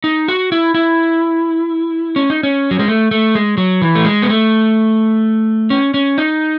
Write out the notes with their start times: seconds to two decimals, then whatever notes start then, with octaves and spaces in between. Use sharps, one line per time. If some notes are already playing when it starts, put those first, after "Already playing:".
0.04 D#4
0.28 F#4
0.52 E4
0.75 E4
2.16 C#4
2.30 D#4
2.43 C#4
2.71 F#3
2.79 G#3
2.88 A3
3.11 A3
3.35 G#3
3.58 F#3
3.82 E3
3.95 A3
4.05 G#3
4.22 B3
4.29 A3
5.70 C#4
5.94 C#4
6.18 D#4